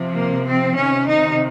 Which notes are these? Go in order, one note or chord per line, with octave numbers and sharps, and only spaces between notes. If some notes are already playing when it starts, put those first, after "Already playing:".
Already playing: C3 F3
A#3
C4
C3 D#3 C#4
D#4